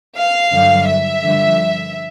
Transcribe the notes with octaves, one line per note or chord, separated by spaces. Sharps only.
F5
G2 D3 F#3
E5
G2 D3 F3